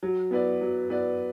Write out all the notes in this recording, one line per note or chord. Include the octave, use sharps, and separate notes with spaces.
F#3
B3 E4 B4 D5
F#3
B3 E4 B4 D5